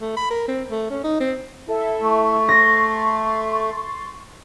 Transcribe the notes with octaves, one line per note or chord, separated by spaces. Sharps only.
A3
B5
A#4
C4
A3
C#4
D#4
C4
E4 A4 E5
A3 C#6
C6 A6 A#6